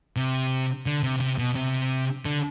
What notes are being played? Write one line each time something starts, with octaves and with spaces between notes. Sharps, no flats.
C3
D3
C3
C3
B2
C3
D3